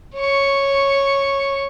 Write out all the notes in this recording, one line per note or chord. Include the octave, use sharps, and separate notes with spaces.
C#5 C#6